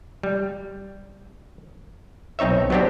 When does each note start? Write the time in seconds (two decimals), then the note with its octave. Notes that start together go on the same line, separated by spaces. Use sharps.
0.23 G3
2.39 B1 C4 D#4 C#5 E5
2.70 F#3 B3 C4 D4 G4